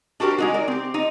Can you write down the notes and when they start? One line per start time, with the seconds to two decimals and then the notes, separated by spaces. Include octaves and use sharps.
0.20 D4 F#4 G4 A#4 C5
0.38 G#3 D#4 F#4
0.54 A#4 D5
0.68 C4 G4
0.94 D#4 D#5